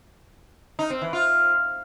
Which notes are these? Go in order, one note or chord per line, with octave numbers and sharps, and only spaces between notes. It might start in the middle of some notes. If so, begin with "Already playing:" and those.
D#4
C4
E3
F4